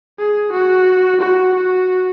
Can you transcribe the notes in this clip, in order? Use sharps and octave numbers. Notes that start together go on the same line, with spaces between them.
G#4
F#4
F#4
F#4